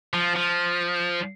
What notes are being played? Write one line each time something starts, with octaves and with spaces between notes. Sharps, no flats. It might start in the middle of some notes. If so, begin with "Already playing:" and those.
F3
F3